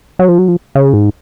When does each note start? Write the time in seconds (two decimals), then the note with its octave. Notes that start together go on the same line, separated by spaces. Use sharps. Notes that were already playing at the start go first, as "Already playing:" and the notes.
0.19 F#3
0.29 F3
0.38 F#3
0.48 F3
0.75 C#3
0.93 G#2